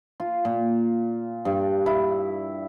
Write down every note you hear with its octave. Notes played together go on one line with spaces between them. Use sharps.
F4
A#2
G2
E4